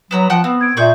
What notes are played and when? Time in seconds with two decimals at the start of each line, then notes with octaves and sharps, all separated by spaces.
0.11 F#3 B3 B4 A#5 E7
0.30 F3 F#5 G5 F#6
0.44 B3 C4
0.61 G#6 D7
0.77 A#2 G#4 A#4 D5 E5 C#6 G6